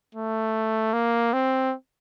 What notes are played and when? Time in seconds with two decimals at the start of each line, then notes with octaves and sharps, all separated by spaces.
0.14 A3
0.93 A#3
1.33 C4